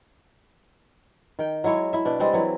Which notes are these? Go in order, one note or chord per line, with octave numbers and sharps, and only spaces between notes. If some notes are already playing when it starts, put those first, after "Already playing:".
D#3 G5
F#3 G#3 E4 C#5
E4 E5
B2 D4
G3 G#3 C4
E3 F#3